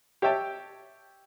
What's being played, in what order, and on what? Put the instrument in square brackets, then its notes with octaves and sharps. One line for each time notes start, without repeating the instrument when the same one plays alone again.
[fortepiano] G4 C#5 E5 G5 A5